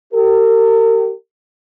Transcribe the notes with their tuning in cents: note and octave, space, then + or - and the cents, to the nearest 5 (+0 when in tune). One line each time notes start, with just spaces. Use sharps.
G4 -30 A#4 -40